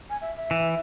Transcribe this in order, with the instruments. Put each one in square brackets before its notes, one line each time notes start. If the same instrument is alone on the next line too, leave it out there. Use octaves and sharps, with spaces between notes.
[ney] G#5
E5
E5
[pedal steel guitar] E3